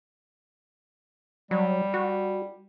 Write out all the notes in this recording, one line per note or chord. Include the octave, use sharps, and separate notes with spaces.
F#3 G3
F#4